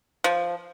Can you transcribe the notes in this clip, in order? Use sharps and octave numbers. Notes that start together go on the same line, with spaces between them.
F3